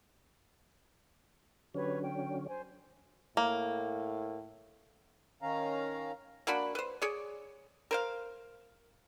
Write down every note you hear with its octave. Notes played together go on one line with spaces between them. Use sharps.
D3 F#3 C#4 G4 B4 C#5
G5
C5 G#5
A2 A#3
D#3 C#4 F5 A#5
A#3 D4 F#4 B5
B4 C5
G#4 C#5 D5
A#4 C5 F5